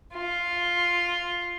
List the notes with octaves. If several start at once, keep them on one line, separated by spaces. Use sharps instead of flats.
F4